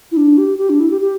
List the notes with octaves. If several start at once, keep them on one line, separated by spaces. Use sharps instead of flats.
E4
D4
G4
G4
D4
E4
G4
G4